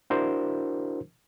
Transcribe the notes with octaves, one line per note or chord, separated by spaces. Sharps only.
D4 E4 F#4 A#4 C5